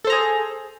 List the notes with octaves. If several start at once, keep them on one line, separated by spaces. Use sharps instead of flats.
G#4 A4 C5 A#5